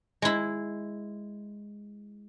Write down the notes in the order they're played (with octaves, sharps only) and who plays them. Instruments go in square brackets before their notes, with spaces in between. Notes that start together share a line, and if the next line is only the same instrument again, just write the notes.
[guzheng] G#3 E4